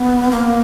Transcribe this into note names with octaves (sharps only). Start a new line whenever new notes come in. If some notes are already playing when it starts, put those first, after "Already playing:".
Already playing: B3
A#3